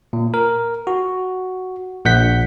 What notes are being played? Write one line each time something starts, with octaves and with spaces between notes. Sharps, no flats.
A#2
A#4
F#4
A#1 F#5 G6 B6